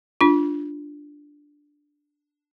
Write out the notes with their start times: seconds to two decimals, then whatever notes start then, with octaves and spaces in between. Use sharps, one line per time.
0.21 D4 F4